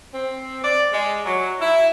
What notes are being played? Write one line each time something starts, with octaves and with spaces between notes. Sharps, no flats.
C4
D5
G#3
F#3
E4